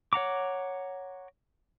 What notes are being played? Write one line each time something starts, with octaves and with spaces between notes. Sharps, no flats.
C#5 F#5 A#5 D6